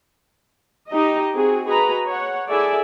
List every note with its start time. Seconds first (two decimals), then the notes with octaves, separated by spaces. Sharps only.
0.89 D#4 G4 D#5
1.34 C4 F#4 G#4
1.66 F#4 G#4 B4 D#5 A#5 B5
2.07 C#5 F#5
2.49 E4 G#4 A4 D5 E5 G#5